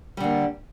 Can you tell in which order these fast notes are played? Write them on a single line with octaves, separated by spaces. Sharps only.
G3 D3 A#3